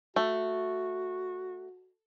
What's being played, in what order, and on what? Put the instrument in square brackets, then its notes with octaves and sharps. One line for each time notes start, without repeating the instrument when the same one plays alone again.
[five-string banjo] A3 [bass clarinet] F#4